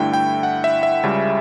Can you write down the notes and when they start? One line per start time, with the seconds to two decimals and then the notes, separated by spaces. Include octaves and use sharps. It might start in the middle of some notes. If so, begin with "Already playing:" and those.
Already playing: G2 D3 A3 E4 G5
0.13 G5
0.43 F#5
0.64 E5
0.83 E5
1.03 C#2 C#3 G3